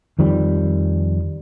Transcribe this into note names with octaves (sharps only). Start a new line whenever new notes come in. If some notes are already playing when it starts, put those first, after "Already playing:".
F2 D#3 F3 G3